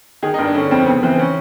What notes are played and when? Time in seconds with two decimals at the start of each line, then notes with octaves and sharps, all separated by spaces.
0.22 D#3 G#4
0.34 G2 D#4
0.45 D4
0.54 D3 C#4
0.71 F2 C4
0.86 C#3 B3
1.03 E3 C4
1.19 C#4